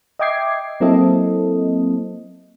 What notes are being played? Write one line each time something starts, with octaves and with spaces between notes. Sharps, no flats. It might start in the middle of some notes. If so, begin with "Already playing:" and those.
D#5 E5 G5 D6 G#6 C7
F#3 A#3 C4 E4 A4 D#5